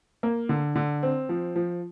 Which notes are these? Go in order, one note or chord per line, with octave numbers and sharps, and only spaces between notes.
A#3
D3
D3
C4
F3
F3